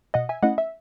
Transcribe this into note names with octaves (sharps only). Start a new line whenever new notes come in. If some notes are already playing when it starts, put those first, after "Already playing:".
B2 D#5 F#5
E5 G#5
A3 C#4 E4 D#5 F#5
E5